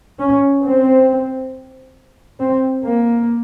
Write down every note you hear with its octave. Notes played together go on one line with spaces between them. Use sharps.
C#4
C4
C4
A#3